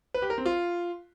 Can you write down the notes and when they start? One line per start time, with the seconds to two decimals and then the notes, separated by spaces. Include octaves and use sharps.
0.14 B4
0.22 G4
0.30 A#4
0.38 C4
0.46 F4